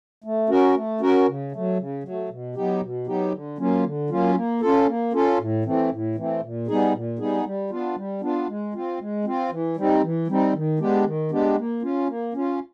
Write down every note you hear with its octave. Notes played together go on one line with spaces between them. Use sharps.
A3
C#4 F#4 A#4
A3
C#4 F#4 A#4
C#3
F#3 A3
C#3
F#3 A3
B2
F#3 B3 D#4 G4
B2
F#3 B3 D#4 G4
D3
F#3 A#3 C#4 F4
D3
F#3 A#3 C#4 F4
A#3
C#4 F4 A4
A#3
C#4 F4 A4
A2
E3 A3 C4
A2
E3 A3 C4
A#2
G3 B3 D#4 G#4
A#2
G3 B3 D#4 G#4
G3
B3 D4 F4
G3
B3 D4 F4
G#3
C4 F4
G#3
C4 F4
E3
G3 C4 D#4
E3
G3 C4 D#4
D#3
G#3 B3 D4 G4
D#3
G#3 B3 D4 G4
A#3
C#4 F4
A#3
C#4 F4